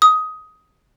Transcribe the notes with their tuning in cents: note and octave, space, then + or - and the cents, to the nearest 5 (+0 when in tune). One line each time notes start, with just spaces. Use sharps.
D#6 +15